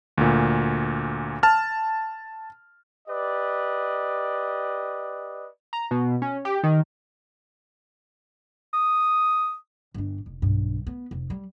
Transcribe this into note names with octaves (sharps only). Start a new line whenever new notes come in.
D2 A#2
A5 F6
G4 B4 D5 D#5
A#5
B2
C#4
G4
D#3
D#6
G1 D4
F1
B1 G2
B3
F1
G3